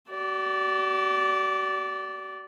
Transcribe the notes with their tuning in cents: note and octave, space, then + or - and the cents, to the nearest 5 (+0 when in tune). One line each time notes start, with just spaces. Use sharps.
F#4 +40 D5 -15